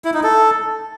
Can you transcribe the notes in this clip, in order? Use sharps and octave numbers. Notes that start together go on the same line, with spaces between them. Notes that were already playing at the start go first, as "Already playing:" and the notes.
E4
D#4
A4